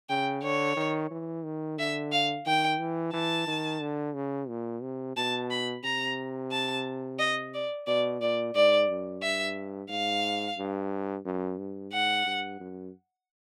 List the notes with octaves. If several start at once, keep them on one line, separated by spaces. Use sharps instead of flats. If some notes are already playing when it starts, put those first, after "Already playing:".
C#3 G5
D3 C#5
D#3
E3
D#3
D3 E5
F5
D#3 G5
E3
E3 A5
D#3
D3
C#3
A#2
C3
B2 A5
B5
C3 A#5
A5
D#5
D5
B2 D5
A#2 D5
G#2 D5
F#2
G2 E5
G#2 F5
G2
F#2
G2
G#2 F#5
G2
F#2